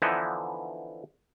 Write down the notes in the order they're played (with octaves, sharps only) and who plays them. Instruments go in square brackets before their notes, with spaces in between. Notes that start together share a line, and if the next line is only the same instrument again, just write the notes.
[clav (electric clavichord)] D3 E3 F3 B3 D#4 E4